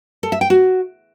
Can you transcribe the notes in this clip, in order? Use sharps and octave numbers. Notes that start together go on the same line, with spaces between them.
A4
E5
G5
F#4